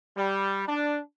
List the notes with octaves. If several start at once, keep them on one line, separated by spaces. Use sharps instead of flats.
G3
D4